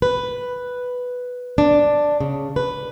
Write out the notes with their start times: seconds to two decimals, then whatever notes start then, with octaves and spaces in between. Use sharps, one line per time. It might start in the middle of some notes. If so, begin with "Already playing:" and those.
0.02 B4
1.58 D4
2.21 C#3
2.56 B4